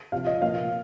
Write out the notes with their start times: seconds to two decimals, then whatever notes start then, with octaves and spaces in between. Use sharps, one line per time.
0.12 C3 F3 F5
0.27 D#5
0.42 A#2 F3 F5